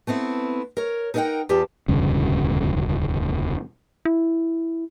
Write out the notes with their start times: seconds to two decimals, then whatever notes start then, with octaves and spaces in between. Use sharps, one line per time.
0.07 A3 B3 C4 E4
0.77 A#4 C#5
1.14 D#4 A4 A#4 D5 F#5 G5
1.49 E2 F4 G4 A5
1.88 E1 D2 G2 C#3
4.05 E4